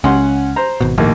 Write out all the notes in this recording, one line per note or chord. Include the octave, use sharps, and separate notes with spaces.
C#2 C#4 F#5 C6
C5 A#5
G#1 B2
A#1 D#2 A2 A#3